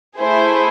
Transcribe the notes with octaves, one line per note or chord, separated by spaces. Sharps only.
A3 E4 G#4 C5